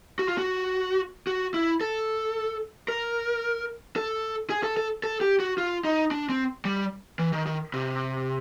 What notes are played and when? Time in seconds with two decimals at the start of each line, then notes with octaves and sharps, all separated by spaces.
0.19 F#4
0.28 F4
0.38 F#4
1.27 F#4
1.54 E4
1.81 A4
2.88 A#4
3.96 A4
4.50 G#4
4.63 A4
4.77 A4
5.04 A4
5.21 G4
5.40 F#4
5.58 F4
5.84 D#4
6.11 D4
6.30 C4
6.65 G3
7.19 E3
7.33 D#3
7.46 D#3
7.74 C3